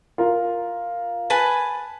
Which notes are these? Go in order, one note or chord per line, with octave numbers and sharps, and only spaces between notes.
F4 A#4
B4 G#5 A5